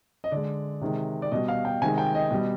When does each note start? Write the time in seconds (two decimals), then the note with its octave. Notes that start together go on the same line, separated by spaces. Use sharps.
0.24 D#5
0.32 D3 G#3 D5
0.81 C3 D#3 G#3
1.22 D5
1.32 B2 G3 D#5
1.48 F5
1.65 G5
1.81 C3 D#3 G#3 G#5
1.98 G5
2.15 D#5
2.31 B2 G3